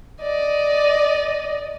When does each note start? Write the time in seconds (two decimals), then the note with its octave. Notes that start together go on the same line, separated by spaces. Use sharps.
0.21 D5 D#5